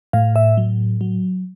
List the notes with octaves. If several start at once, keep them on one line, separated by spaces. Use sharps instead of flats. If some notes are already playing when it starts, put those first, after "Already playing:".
A2 F5
E5
F#3
F#3